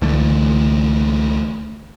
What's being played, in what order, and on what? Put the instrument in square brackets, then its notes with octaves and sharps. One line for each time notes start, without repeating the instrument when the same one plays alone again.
[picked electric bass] C#2 D3 E3 A3